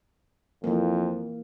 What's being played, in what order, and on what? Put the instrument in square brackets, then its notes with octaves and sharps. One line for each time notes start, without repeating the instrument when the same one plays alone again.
[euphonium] F2 [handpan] E3 A#3